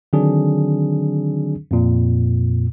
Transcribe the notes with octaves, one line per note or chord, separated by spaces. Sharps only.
D3 D#3 F#3 C4 D4 G#4
F2 A#2